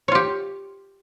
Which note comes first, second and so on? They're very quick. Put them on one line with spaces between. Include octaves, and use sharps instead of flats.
C#5 F4 G4